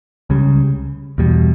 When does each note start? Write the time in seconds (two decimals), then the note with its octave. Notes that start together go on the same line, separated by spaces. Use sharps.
0.30 C#2 C#3 G3
1.18 E2 B2 G3